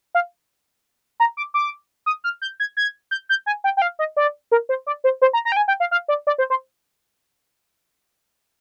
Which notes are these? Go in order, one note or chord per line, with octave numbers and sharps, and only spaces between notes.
F5
A#5
D6
D6
D#6
F6
G6
G#6
G#6
G6
G6
G#5
G5
G5
F5
D#5
D5
A#4
C5
D5
C5
C5
A#5
A#5
G5
G#5
G5
F5
F5
D5
D5
C5
C5